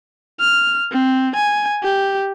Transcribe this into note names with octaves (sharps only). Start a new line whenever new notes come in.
F6
C4
G#5
G4